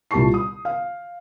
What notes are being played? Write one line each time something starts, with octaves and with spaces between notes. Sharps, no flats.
C2 A#2 G4 A5 C#6 C7
D#6
F5